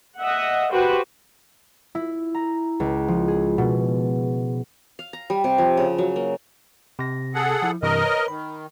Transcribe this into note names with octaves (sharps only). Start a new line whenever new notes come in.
D#5 E5 F#5
F#4 G4 B4 C5 G5
E4
A#5
C#2
F3
G#4
B2
F5
A#5
G3
C3
F3
C#3
F#3
A#3
C3 A#6
G#4 A4 F#5
F3 E4
G2 C3 E3 A#4 D#5
B4 C#5
D#3 B5